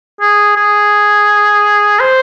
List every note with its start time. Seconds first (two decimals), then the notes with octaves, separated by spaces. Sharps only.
0.21 G#4
0.57 G#4
2.00 C5